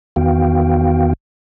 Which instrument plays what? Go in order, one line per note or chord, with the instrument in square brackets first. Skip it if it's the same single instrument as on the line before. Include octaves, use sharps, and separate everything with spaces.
[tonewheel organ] E2 D#3 B3 F#4 F5 G5